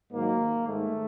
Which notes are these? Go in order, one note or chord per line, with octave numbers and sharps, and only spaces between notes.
G#2 D#3 F#3 A#3
G#2 D#3 G#3 A3